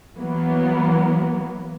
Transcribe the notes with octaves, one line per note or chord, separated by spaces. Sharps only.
E3 F#3 A#3 B3